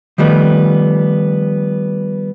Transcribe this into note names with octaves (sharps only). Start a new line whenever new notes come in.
D#3 F3 G3 A3 B3